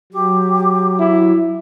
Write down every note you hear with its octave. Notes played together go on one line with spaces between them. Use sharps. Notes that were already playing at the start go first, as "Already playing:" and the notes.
F#3 G4
E4